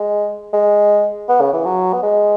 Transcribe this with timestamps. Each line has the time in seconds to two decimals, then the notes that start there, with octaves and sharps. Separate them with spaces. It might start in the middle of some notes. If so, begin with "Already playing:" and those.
Already playing: G#3
0.53 G#3
1.29 B3
1.41 C#3
1.53 E3
1.65 F#3
1.93 B3
2.03 G#3